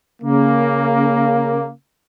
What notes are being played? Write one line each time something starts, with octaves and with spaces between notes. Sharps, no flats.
C#3 A#3